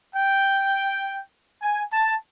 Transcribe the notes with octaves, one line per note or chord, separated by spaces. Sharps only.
G5
G#5
A5